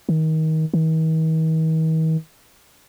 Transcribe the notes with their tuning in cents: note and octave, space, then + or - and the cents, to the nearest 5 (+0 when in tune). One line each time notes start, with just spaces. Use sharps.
D#3 +25
D#3 +45